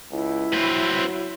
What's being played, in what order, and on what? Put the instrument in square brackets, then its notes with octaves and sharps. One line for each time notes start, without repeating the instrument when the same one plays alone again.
[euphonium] C#2 [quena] E4
[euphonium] F#3 [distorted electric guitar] C4 B4